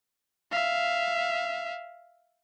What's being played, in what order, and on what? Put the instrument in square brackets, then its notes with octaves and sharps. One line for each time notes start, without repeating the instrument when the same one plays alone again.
[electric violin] E5 F5